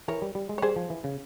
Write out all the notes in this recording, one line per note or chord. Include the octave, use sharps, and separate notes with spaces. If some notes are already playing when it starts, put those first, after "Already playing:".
E3 A#4 C#5
G3
G3
G#3
C#5
G3 G#4 C5
F3
E3
C#3